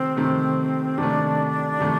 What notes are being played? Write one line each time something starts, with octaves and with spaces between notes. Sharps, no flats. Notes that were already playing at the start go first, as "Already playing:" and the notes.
Already playing: C3 D#3 A3 C4
C3 D#3 A3
C3 D#3 A3 D4
C3 D#3 A3